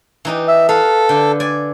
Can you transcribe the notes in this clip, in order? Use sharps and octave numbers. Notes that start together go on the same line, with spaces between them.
E3 D#4 G4
E5
A4 B4 F5
D3 G5
D5 G#5